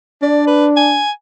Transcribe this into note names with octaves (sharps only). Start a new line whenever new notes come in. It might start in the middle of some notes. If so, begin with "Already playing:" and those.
D4 D5
B4
G#5